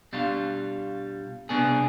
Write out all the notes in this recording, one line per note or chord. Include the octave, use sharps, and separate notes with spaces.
B2 G3 D4 F4
C2 B2 B3 D4 G#4